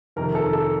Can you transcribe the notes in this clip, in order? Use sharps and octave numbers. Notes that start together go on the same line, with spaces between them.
F2 C3 D#3 A#4
A4
A4